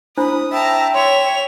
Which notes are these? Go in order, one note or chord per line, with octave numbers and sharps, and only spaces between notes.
D4 E4 C5 B5 D#6
E5 G5 A5 A#5
C#5 E5 C6 F7